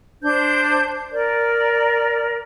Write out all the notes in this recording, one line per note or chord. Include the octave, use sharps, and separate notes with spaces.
D4 C5 G6
A#4 D5